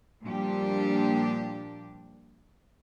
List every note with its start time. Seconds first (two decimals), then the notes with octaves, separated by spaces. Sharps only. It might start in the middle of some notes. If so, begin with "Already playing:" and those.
0.24 A#2 F3 G3 D4 G4